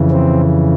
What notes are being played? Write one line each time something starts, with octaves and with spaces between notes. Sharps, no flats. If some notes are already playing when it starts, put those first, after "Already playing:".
Already playing: F2 C#3 E3
C4